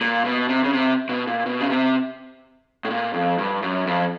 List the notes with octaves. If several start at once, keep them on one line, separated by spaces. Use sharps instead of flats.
A#2
B2
C3
C#3
C3
B2
A#2
B2
C#3
C3
A2
A#2
F2
G2
F#2
F2